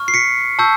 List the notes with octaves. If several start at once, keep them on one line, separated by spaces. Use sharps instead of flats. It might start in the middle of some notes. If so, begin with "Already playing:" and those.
Already playing: C#6 F6
C7
B6 C#7
A5 C#6 E6 G6